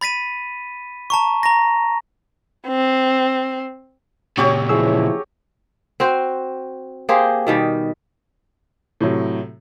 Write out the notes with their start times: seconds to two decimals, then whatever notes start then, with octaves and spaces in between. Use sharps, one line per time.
0.01 B5 A6 B6 D#7
1.10 A5 A#5 C#6
1.43 A#5 A#6
2.68 C4
4.38 A#2 C#3 F#3 G4 C#5
4.69 E3 F3 E4 G#4 E6
6.00 C4 F#4 C5
7.09 A#3 G4 G#4 C5
7.47 B2 D#3 G3
9.01 A2 C3 F#3